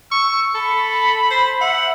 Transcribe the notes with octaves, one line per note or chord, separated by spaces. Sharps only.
C#6 E6
A4 B5
C5
E5 F#5